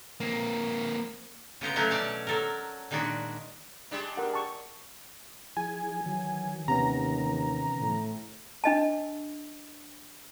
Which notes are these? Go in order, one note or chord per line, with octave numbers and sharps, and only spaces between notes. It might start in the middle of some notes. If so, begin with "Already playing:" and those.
A#3 C4
C#3 B3 C5 A#5
F#3 A3 C#4 F#4 A#4 C5
B2 C#4 C#5 D5
F#3 A4 A#4
A#2 D#3 G#3 D4 F#4
G3 G#3 D4
A#4 F#5
A5 C#6
F3 E4 G#4 G#5
D#3 E3 F#3
D#2 C3 B3 C#4 A#5
A2
D4 D#5 A5